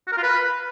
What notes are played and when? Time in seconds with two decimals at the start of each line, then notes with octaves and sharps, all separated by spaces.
0.07 F#4
0.12 A#4
0.18 F4
0.23 B4